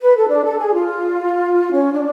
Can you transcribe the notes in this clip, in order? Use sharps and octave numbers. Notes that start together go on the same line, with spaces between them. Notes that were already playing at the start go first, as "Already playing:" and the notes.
B4
A4
D4
A4
G#4
F4
C#4
F4
D4